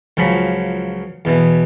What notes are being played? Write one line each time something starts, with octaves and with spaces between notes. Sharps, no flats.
C#2 C#3 F3 F#3 B5
E2 B2 E3